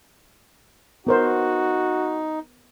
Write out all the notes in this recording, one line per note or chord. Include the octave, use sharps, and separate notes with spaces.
B3 D#4 F#4 A#4 C5